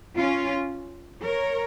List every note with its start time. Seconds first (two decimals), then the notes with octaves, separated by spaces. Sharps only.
0.17 C#4 F4
1.24 A#4 C#5